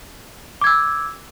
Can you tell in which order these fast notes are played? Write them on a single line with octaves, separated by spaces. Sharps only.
D6 G#6 E6